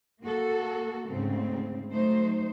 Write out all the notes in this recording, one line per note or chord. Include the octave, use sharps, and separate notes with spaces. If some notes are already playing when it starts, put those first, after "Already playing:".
A#3 F#4 A4
D2 G#2 C#3 C4
F#3 A3 D#4 C5